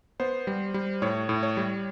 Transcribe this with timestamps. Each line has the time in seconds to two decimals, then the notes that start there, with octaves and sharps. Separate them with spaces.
0.20 B3 C5
0.47 G3
0.74 G3
1.02 A2 C#5
1.29 A2
1.43 C#5
1.57 G3